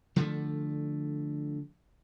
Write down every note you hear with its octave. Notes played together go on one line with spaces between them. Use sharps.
D3 F3 A3